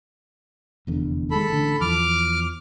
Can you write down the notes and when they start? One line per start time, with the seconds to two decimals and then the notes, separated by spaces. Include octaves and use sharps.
0.87 F1 E2 D3
1.31 D#3 G#3 A4 B5
1.48 A1 D3
1.81 E2 E3 F3 D6 F6